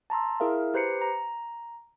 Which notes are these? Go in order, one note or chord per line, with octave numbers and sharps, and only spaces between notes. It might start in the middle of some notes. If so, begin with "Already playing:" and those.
A5 A#5 C6 E6
E4 G#4 A#4 E5 F5
G4 B4 C5 A#5 C7 C#7
A#5